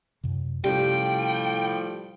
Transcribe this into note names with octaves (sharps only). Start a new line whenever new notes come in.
F#2 C3
A2 C3 F3 G3 C#4 G4 G5